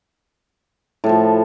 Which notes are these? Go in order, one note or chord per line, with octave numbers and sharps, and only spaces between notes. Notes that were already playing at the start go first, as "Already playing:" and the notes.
A2 F3 A3